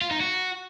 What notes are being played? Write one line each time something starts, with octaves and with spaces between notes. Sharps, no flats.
F4
D#4
F#4